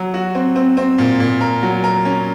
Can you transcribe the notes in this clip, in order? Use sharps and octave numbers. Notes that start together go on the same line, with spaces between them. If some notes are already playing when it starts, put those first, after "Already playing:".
Already playing: F#3
F#4
C4
C4
C4
A#2
A#2
A#4
F#3
A#4
C#4